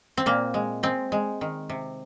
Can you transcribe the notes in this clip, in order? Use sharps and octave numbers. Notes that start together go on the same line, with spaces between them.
C4
A#2 A#3
G#3
G#3 C4
G#3
D#3
C3